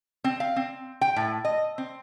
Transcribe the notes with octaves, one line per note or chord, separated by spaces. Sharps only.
C4
F5
C4
G5
A2
D#5
C4